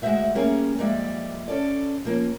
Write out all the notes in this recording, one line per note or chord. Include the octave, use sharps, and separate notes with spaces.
D2 G#3 F#4 C5 E5 F#5
G3 A#3 C#4 G#4 A#4
F2 G3 G#3 A#3 D5 E5
C#4 A4 D5
F3 A#3 C#4